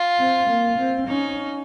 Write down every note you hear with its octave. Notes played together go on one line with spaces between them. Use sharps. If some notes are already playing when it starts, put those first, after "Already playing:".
Already playing: F4
C4
A#3
C4
C#4 D#4